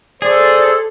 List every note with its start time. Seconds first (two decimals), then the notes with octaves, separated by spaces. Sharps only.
0.22 G#4 A4 C5 D5